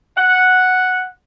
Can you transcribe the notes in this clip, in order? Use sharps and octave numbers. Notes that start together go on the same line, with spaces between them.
F#5